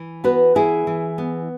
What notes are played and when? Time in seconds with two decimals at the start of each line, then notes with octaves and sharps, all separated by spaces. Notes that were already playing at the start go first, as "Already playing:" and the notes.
Already playing: E3
0.24 B3 F#4 B4
0.55 E3 E4 G#4
0.87 E3
1.18 B3